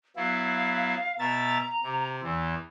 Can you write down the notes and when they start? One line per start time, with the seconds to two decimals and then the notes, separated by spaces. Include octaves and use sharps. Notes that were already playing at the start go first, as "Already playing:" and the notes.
0.16 F#3 B3 E4 F5
1.19 B2 E5 A#5 A6
1.83 C3
2.23 E2 E3